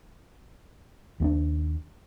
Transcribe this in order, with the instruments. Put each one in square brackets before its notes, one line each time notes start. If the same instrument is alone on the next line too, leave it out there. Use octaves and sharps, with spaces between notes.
[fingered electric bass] D#2 A#3 D4